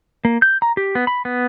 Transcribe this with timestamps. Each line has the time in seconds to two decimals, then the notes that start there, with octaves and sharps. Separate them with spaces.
0.25 A#3
0.42 G6
0.62 A#5
0.77 G4
0.95 B3
1.07 B5
1.25 B3